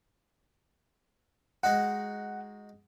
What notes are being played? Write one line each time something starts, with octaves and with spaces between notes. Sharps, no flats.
G#3 D#4 F#4 F#5